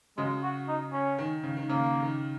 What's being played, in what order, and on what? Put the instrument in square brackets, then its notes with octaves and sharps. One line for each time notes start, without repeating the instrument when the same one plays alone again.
[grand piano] C#3 F#3 [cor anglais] G#3
[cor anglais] F#4
D#4
C#4
[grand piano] D#3
C#3
D#3
[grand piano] C#3 [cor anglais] A#3
[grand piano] D#3